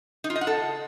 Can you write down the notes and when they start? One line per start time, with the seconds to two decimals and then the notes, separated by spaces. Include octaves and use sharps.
0.24 D#4
0.30 F4
0.36 D#5
0.41 F#5
0.47 A4